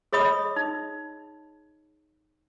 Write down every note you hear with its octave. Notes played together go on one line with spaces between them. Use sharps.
G#4 C#5 D#5 B5 D#6
D#4